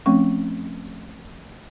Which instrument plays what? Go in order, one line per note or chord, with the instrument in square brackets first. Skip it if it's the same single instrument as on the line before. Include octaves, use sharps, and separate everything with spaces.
[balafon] F3 A3 C4 C#4 C#6